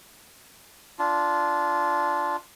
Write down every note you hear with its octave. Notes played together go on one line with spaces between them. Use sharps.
D4 F4